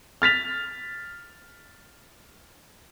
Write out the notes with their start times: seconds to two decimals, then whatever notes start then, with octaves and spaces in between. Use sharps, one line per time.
0.22 F6 A6 B6 F7